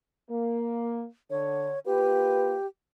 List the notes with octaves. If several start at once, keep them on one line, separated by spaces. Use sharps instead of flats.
A#3
D3 C#5
A#3 F4 G4 B4